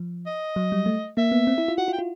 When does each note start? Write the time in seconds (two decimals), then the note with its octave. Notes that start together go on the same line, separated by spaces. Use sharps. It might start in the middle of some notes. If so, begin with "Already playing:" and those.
Already playing: F3
0.26 D#5
0.56 F#3
0.72 G3
0.86 A3
1.17 A#3 E5
1.32 B3
1.47 C4
1.58 E4
1.68 F4
1.78 F#4 F#5
1.88 F4
1.93 G5
1.99 F4